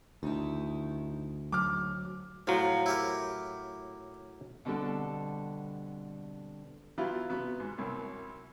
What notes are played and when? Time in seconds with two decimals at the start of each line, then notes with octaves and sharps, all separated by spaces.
0.23 D2 D#3 D#4 E4
1.52 G#2 F#3 D6 F6
2.47 A2 F3 F#3
2.86 E4 G4 A#4
4.65 B2 D3 G3 C4 A4
6.98 F#3 B3 E4 F4 G4
7.29 C3 F#3 B3 B4
7.60 G#2
7.78 C2 F#2